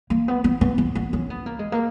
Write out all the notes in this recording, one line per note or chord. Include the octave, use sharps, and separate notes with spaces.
A#3
B3
B3
B3
B3
B3
C#4
B3
A#3
G#3
A#3